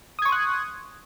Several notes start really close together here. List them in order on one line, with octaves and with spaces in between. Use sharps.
D#6 G#6 C#6 C6 F#6